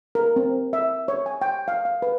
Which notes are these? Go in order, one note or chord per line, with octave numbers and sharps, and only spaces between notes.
A#4
C4
E5
C#5
G#5
G5
F5
F5
B4